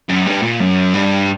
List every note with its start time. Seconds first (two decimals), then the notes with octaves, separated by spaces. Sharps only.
0.09 F#2
0.26 G2
0.42 A#2
0.60 F#2
0.94 G2